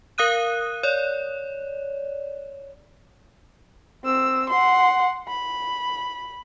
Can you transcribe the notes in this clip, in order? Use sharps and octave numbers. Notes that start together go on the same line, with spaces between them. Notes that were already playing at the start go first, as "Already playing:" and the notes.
A#4 F5 D#6 F#6 D#7
C#5 D5
C4 E6
F#5 C6
B5